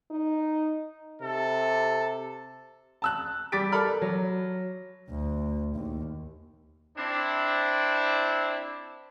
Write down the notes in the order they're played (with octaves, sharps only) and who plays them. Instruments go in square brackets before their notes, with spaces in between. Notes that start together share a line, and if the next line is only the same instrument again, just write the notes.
[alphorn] D#4
[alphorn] C3 [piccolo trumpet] A4
[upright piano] A5 E6 F#6
G3 D6 A6 B6 D7
A4 A#4 D5 B5 F6
F#3
[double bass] D2
D#2
[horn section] C4 D4 E4